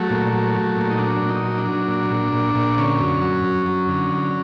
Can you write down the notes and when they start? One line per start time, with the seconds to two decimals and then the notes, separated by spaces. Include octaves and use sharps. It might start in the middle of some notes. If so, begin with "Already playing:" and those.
Already playing: F#3 A3
0.10 A#2
0.33 F#3
0.55 F#3
0.77 A#2
0.90 D#4
0.99 F#3 D4
1.21 A#2
1.29 D#4
1.44 F#3
1.58 D4
1.66 F#3
1.88 A#2
2.10 A#2
2.33 A#2
2.55 A#2
2.78 D3 C#4
3.00 F#2
3.21 F#3
3.44 F#2
3.66 F#3
3.88 D3
4.11 F#3